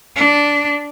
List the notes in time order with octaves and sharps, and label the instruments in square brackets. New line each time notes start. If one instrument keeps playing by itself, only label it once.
[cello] D4